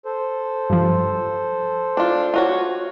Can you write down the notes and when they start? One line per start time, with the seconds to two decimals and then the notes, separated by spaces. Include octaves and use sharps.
0.05 A4 C5
0.70 G2 F3
1.97 D4 F4
2.34 F4 F#4 C#5